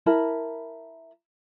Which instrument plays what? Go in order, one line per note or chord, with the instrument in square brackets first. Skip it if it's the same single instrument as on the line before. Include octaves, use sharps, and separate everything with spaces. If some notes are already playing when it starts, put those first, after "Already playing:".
[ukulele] E4 A#4 A5 B5